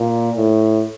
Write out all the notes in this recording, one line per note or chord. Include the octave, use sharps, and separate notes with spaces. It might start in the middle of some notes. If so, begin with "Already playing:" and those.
Already playing: A#2
A2